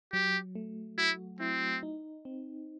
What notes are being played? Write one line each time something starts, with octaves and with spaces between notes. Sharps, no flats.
F#3 G4
A3
E4 F#4
C4 E4
D#4
C4